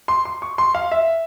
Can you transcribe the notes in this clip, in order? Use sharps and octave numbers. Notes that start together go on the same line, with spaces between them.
C6
C6
C#6
C6
F5
E5